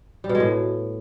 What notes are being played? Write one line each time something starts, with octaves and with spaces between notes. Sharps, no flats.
G3
B2
G#3
A2